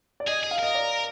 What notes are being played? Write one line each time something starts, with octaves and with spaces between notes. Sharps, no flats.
D5
G#4 D#5
G#4 D#5
F5
A#4 D#5
D5